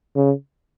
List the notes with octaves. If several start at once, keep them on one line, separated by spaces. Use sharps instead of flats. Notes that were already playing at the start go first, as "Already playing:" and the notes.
C#3